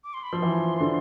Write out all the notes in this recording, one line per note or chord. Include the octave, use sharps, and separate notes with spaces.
D6
C6
B5
F3 C6
E3
D3